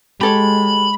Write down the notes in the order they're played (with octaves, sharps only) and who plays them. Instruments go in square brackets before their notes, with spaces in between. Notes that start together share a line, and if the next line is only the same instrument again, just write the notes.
[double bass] G#3 [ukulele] G4 A4 C#5 [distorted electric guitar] B5